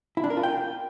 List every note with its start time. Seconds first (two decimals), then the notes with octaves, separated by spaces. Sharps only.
0.17 E4
0.24 D4
0.30 A#4
0.37 F4
0.43 G5